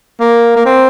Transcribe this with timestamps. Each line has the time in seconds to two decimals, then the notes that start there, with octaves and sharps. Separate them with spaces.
0.20 A#3
0.56 A#3
0.66 C4